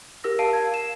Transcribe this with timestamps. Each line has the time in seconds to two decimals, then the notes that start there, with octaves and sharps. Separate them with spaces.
0.24 G4 A#4 E6 A#6
0.39 F5 A5 C7 D7 D#7
0.53 G#6
0.74 E7